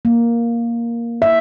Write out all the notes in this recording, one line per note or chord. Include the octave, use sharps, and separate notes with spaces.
A#3
E5